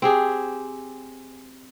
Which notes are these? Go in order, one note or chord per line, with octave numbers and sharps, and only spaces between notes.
C4 G4 G#4